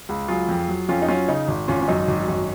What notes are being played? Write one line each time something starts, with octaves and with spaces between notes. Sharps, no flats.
C#2
F#3 F4 G#4
F2
F#3
F2 C#4 F4
D#4
F#3 C#4 F4
C#3 D#4
G#1
G#1 C#4 F4
C#4
F#2 D#4
G#1
F#2